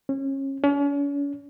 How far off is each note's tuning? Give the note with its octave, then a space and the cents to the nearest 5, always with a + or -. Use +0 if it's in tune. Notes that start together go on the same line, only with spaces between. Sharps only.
C#4 -30
C#4 +40